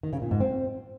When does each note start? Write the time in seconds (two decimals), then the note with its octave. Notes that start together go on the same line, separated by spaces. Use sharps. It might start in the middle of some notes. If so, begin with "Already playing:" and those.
0.03 D#3
0.13 C#3
0.22 A#2
0.31 G#2
0.40 C4